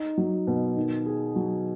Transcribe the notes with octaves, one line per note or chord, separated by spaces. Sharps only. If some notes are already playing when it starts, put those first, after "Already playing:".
Already playing: D#4
F#3
B2
D#3
G#4
F#3